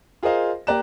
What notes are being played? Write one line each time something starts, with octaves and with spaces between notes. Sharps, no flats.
F4 G#4 A#4 C5 D#5 F5
A#3 G4 D5 A#5 F#6 E7